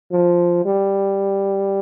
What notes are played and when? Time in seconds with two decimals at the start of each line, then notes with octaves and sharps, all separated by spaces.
0.12 F3
0.65 G3